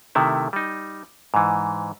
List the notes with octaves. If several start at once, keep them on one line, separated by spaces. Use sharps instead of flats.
C3 D#3 A3 E4
G3 D#4
G#2 E3